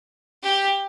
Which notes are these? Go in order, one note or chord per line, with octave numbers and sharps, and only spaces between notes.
G4